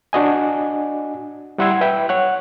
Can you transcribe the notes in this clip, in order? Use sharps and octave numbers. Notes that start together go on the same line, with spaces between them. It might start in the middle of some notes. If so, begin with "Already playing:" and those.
D4 F#4 D#5 G#5
G3 E4 F#5 C6 E6 G#6
B4 E5 G5
C#5 F#5 F#6